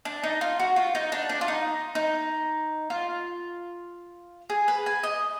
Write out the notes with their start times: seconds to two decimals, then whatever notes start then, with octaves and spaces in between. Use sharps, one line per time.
0.05 D4
0.24 D#4
0.41 F4
0.60 F#4
0.76 F4
0.95 D#4
1.12 D4
1.29 D4
1.41 F4
1.48 D#4
1.95 D#4
2.90 F4
4.50 G#4
4.68 B4
4.86 G#5
5.03 D#5